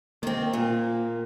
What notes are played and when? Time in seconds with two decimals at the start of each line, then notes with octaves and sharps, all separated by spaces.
0.23 D#3 A#3 C4
0.53 A#2